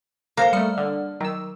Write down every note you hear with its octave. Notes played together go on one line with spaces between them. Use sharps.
A#3 A4 C5 A#5
G3 A3 D5 C#7
D3
D#3 F#3 E6